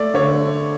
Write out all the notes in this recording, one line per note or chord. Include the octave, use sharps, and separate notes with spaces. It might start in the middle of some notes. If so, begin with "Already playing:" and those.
Already playing: A3 D5
D3 C#5